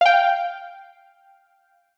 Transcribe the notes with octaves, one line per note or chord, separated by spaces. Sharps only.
F5 G5